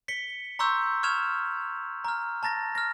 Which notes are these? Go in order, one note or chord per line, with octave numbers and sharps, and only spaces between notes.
B6 C#7 G7
A#5 C6 C#6 E6 G6
C#6 F6 G#6 E7 F7
A#5 F6
A5 A#5 A6 A#6
F6 A#6